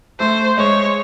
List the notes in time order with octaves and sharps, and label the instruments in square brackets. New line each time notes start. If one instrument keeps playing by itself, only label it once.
[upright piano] A3 [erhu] C5
[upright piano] G#3 [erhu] C#5